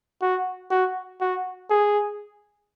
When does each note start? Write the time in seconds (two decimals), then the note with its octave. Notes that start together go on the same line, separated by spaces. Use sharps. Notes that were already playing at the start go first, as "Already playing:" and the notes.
0.22 F#4
0.71 F#4
1.21 F#4
1.70 G#4